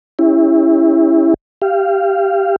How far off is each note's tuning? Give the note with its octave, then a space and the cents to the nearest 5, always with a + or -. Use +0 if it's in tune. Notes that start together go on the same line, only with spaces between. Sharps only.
C#4 +0 E4 -5 G4 +40
G4 +0 F5 -20